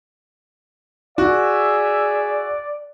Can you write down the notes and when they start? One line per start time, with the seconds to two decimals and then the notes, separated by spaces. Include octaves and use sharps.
1.18 F#4 G#4 D5 E5